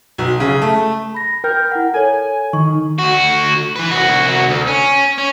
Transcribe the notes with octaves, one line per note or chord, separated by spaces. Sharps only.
B1
C#3
A3
B5 A#6
A#4 G5 F6 G6
E4 F#5
A4 C#5 G#5
D#3 C#6
D2 F#4
E3 B4
C2 F#4
D2
C#4
C#4